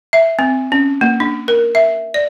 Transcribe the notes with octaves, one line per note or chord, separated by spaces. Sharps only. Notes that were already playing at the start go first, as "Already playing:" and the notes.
E5
C4
C#4
A#3
D4
A#4
E5
D5